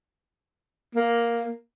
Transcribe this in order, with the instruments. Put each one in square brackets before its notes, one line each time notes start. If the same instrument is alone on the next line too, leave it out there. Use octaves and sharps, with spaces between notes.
[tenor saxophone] A#3